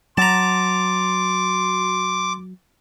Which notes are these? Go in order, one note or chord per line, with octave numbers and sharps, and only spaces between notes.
F#3 A5 A#5 C6 D6